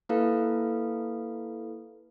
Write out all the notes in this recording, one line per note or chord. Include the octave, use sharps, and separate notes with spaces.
A#3 E4 A4 B4 F5